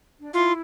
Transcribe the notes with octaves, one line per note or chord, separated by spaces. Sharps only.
D4
E4 F4